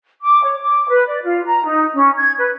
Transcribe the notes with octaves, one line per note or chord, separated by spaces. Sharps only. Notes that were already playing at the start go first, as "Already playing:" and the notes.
D6
C#5
D6
B4
D5
F4
A#5
D#4
C#4
G#6
B4